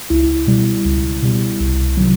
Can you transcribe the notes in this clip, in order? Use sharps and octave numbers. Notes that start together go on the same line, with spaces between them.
C#2 E4
B2 G3
C#2
B2 G3
C2
C3 D#3 F#3